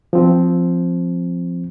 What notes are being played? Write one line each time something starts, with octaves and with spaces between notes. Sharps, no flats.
F3 C4